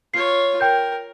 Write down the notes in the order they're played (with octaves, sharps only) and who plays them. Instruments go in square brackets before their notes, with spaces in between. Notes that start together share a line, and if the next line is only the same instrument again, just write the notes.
[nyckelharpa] F4 C#5 [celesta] C7
[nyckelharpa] A#4 [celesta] G5 G6